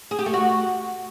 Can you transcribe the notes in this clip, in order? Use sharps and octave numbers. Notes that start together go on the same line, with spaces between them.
G#4
G4
A3
F#4